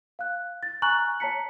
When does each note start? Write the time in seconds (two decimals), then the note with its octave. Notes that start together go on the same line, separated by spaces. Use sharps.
0.19 F5 F#6
0.63 A6
0.82 G#5 A#5 C#6 F6 F#6 F#7
1.20 C#5 A5 A#5 B6 C#7